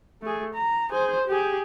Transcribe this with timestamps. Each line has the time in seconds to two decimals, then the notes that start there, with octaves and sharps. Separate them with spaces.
0.22 A3 G#4
0.54 A#5
0.90 G#4 C5
1.27 G4 G#4